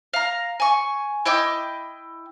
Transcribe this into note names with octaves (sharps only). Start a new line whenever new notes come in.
F5 A#5
G#5 C#6
E4 D#5 G5 D6